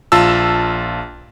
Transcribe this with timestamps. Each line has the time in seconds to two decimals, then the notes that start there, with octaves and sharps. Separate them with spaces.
0.12 A#1 F4 A5 E6